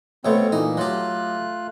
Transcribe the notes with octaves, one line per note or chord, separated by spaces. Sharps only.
B2 A3 B3 C4 C#5
A#2 E3 D#4
F#3 A3 F4 G4 F#6